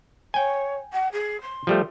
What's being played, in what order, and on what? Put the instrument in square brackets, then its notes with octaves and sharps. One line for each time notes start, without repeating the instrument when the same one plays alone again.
[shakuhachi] C#5 [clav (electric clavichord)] G5 G#5
[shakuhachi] F#5
G#4
C6
[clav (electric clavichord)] F3 G3 A3